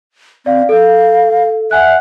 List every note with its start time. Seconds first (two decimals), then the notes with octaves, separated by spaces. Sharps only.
0.46 C4 D5 F5
0.69 A4 F5
1.71 E5 F#5 G#5 F#6